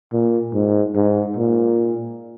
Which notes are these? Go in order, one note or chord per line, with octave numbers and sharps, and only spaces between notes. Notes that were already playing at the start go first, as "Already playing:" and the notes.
A#2
G#2
G#2
A#2